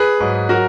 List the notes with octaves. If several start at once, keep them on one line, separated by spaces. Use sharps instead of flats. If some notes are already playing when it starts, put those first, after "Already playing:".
Already playing: G#4 B4
G#2 F#3
F#3 F#4 A#4